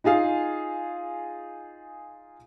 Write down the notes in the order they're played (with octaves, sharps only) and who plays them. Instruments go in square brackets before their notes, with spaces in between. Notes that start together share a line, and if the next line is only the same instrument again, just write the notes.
[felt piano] D#4 F4 G#4 F5